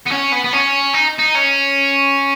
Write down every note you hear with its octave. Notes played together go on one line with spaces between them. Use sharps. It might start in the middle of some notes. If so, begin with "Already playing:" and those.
B3
C#4
B3
B3
C#4
D#4
D#4
C#4